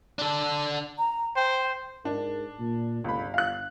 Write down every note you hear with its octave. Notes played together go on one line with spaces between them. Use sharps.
D4 A4
A#5
C5 G5
G#2 D4 A#4
A#2
G1 C#2 B5
F5 F#6